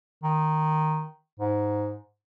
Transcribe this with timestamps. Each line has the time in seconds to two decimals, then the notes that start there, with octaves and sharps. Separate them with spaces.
0.23 D#3
1.40 G#2